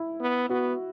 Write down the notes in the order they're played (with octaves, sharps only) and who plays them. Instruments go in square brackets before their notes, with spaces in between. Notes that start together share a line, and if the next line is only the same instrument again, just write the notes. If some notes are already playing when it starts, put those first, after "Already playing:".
Already playing: [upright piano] E4
[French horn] B3
[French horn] B3 [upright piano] F#4